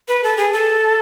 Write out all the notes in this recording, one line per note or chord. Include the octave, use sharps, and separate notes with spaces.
B4
A4
G#4
A4